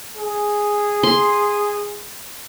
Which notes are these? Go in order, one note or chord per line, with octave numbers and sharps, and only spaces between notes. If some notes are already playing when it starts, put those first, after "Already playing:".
G#4
C6